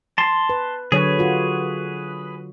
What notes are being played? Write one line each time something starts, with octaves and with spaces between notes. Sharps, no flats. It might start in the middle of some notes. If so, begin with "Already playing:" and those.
A5 C6
B4
D3 F#3 G#4 B4 C#5
F4 F#4